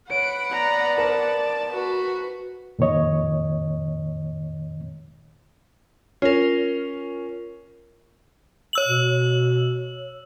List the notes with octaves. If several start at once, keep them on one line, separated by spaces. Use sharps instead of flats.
B4 C#5 F#5 D7
B3 D5 A#5
A#4 C5 A5
F#4 B4
F2 A#2 D#3 C#5 D#5
C#4 F4 A#4
C#5 E6 F#7
B2